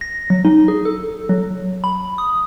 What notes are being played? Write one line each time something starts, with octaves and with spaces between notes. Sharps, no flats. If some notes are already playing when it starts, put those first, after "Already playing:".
A#6
F#3
D#4
G#4
A4
F#3
B5
D#6